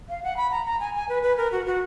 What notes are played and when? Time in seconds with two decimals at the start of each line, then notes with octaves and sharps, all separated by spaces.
0.09 F5
0.23 F#5
0.37 B5
0.52 A#5
0.66 A#5
0.80 G#5
0.95 G#5
1.09 B4
1.23 B4
1.37 A#4
1.52 F#4
1.66 F#4